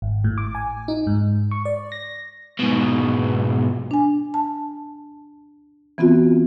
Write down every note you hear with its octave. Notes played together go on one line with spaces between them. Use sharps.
G#1
A2
D6
G#5
D#4
G#2
C#6
D5
A#6
G#2 B2
D4 G#5
A5
E3 B3 C4 F4 F#4